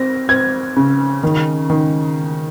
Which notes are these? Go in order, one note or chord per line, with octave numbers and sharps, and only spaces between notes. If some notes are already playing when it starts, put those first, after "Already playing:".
Already playing: C4 A#6
C4 G#6
C#3
D#3
D#3